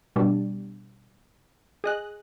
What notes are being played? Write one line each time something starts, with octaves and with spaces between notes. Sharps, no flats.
B2 G3 D4
G#4 D#5 F#6